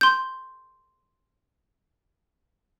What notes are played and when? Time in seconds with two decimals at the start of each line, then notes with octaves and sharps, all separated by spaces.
0.01 C6 G6